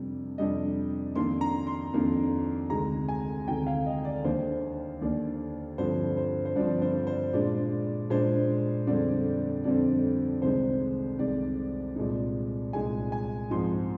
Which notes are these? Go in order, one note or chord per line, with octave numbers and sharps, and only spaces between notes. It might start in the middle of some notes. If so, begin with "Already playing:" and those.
Already playing: F2 C3 G3 D4
F2 C3 G3 D4 D#5
F2 D#3 A#3 D4 C6
A#5
C6
F2 D#3 A#3 D4
D2 C3 D#3 G#3 A#5
G#5
D2 C3 D#3 G#3 G5
F5
D#5
D5
D#2 D#3 A#3 D4 C5
D#2 D#3 A#3 D4 D5
G2 D3 F3 C4 C5
C5
C5
G2 D3 F3 C4 D5
C5
C5
A#2 G#3 D4 D5
A#2 G#3 D4 C5
F2 D3 G3 C4 D5
F2 D3 G3 C4 D5
C2 C3 D#3 G#3 C5
C2 C3 D#3 G#3 D5
C2 A#2 G#3 D#4
C2 A#2 G#3 D#4 G#5
G#5
G#2 F3 C4 D#4 C6